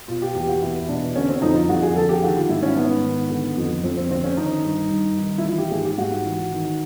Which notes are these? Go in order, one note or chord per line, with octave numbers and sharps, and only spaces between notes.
B2 F4
G4
E2 G4
F#4
E2 E4
B2 D4
D3 C#4
C4
F2 D#4
F4
F2 F#4
G#4
D3 A4
G4
D#3 F#4
F4
G#2 E4
C#4
G#2 B3
D#3
D3
F2
F2 C4
C4
D3 C4
C#4
D#3 D#4
G2
G2
D#3
E4
E3 F4
G4
G#2 G#4
G4
G#2 F#4
E3
D#3